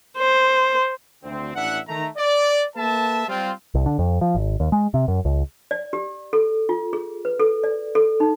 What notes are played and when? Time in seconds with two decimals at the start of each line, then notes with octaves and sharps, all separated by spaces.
0.18 C5
1.23 D2 C4
1.55 A1 E3 D4 E5 F#5
1.88 D#3 A3 A#5
2.17 D5
2.76 A#3 A4 B4 E5 A5
3.28 G3 C4 F4
3.74 C2
3.86 D3
3.99 F2
4.21 F3
4.35 G#1
4.60 D#2
4.72 G#3
4.94 C3
5.08 F#2
5.25 C#2
5.71 D5
5.93 G4
6.33 A4
6.69 F4
6.93 G#4
7.25 B4
7.40 A4
7.64 D5
7.95 A4
8.20 D#4